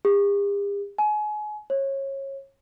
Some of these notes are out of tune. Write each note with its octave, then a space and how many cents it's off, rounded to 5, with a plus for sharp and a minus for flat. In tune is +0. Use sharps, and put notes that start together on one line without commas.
G4 +45
G#5 +30
C#5 -25